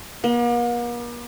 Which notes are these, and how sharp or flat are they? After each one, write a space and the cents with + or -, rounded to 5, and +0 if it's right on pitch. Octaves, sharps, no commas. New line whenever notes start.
A#3 +45